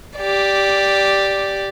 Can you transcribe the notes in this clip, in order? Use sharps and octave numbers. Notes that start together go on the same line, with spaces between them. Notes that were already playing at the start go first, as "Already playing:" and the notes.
G4 D5